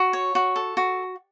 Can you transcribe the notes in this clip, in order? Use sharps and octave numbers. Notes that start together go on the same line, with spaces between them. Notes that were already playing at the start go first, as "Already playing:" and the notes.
Already playing: F#4
C#5
F#4
A4
F#4